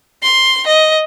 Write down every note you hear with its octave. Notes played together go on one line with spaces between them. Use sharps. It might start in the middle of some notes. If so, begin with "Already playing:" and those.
C6
D#5